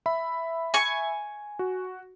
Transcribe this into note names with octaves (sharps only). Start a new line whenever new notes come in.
E5 B5
G#5 C#6
F#4